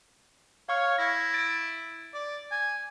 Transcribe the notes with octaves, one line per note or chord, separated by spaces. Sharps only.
C#5 F5 C#6 F6
E4 A#6
A6 D7
D5
G#5